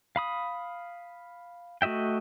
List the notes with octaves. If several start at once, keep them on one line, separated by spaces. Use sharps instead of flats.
F5 B5 D#6
A3 F#4 D#5 E5 G5